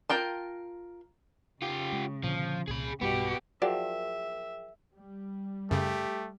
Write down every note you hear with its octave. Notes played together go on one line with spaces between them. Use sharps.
F4 A#4 G5 A5
C#3 F4 G4
G#3
A#2 D3 F3
C2 A#2 G#4 B5
B1 G2 G3 B3 F#4 G4
F3 F#3 G#4 A#4 D5 E5 G5
G3
F#2 C#3 A3 G4